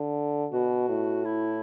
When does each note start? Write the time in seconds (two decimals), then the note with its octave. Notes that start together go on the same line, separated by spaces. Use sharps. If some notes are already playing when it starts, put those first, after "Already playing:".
Already playing: D3
0.52 B2 F#4
0.89 A2
1.24 E4